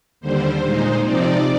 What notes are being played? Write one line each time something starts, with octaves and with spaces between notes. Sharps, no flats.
D#2 D3 G3 C5
A#2 G#3 D#4
C3 F3 C4 D#4 D5